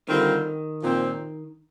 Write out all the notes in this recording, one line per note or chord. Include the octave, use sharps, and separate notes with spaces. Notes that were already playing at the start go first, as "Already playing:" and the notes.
D3 D#3 G3 C4 F4 A#4
A#2 F3 C4